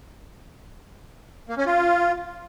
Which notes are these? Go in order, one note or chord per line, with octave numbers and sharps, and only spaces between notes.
A#3
C#4
F4